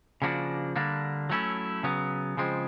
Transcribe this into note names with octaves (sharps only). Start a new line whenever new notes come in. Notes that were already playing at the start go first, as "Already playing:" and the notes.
C#3 F3 A#3 D4 F#4
D3 G3 A#3 D4
F#3 A3 C#4 E4
C#3 F#3 B3
C#3 F3 G#3 C4